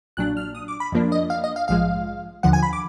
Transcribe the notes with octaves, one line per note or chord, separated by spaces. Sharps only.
A#1 A#2 F#3 D4 F#6
F6
D#6
D6
B5
F2 F3 A#3 D4
D#5
F5
D#5
F5
A#1 G#2 F3 G#3 F5
D#2 D3 F3 F#5
G#5
B5
D6